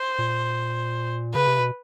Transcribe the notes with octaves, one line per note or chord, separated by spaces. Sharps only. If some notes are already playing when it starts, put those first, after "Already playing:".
Already playing: C5
A#2
C#3 B4
C3
B2